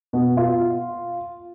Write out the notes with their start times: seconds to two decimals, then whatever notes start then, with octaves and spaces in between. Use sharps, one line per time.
0.13 B2
0.37 F4